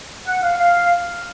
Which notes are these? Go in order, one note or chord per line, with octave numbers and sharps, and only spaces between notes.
F#5
F5
F5